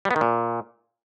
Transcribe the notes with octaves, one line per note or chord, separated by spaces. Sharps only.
G3
B3
D#3
A#2